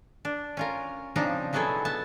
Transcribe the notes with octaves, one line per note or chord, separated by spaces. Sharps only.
D4
C#4 F4 A#4
C#3 F3 C4 D4 D#4
B2 F#3 B3 E4 G#4 A4
B3 A5